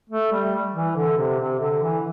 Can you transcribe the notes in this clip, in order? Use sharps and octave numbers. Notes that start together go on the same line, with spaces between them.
A3
G3
E3
D3
C3
C3
D3
E3